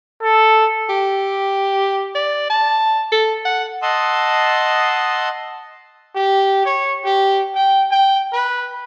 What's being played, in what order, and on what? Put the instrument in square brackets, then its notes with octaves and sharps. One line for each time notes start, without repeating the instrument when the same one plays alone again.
[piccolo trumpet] A4
[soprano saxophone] G4
D5
A5
A4
F#5
[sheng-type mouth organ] D#5 F#5 A5 C6 D#6 E6
[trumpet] G4
C#5
G4
G5
G5
B4